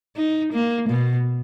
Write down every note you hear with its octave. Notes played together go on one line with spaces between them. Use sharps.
D#4
A#3
B2